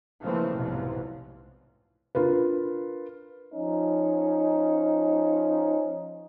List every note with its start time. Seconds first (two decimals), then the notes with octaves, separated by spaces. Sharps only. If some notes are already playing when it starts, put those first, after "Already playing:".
0.21 C#3 E3 F3 A3 A#3 C4
0.55 F1 B1 G#2 C3 E3 F3
2.15 D4 F4 A#4 B4
3.53 F3 C#4 D#4